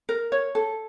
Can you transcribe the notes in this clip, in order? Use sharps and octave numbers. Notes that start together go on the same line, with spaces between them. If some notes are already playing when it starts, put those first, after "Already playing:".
A#4
C#5
A4